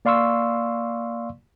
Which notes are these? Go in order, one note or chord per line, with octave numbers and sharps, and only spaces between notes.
A#3 D5 F5 C6 C#6 E6